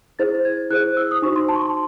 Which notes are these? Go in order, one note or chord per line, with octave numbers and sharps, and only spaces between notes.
E4 G#4 C5 A6
G#6
E4 G#4 C5 F#6
E6
D#6
D#4 F#4 C5 C#6
C6
A5
C#6
C6